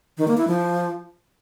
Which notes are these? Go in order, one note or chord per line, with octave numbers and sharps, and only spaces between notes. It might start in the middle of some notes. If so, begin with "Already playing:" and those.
D#3
A#3
E4
F3